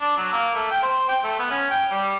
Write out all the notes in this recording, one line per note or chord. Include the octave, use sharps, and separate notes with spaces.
D4
F#3
A#3
A3
G5
C5
G5
A3
B3
C#4
G5
G3